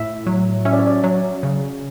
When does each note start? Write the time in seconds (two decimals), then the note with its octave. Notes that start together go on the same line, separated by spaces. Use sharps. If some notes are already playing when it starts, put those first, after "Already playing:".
Already playing: A2 E5
0.27 F#3
0.65 C#4 E5
0.72 D5
0.79 C#5
0.87 D5
1.04 F#3
1.43 C#3